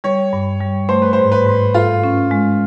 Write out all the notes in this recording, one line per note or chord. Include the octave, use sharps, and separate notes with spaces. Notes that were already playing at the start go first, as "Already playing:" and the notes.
G3 C#5
G2
G3
A3 C5
B4
C5
G#2
B4
G#2
F4 A4
C#4
G#3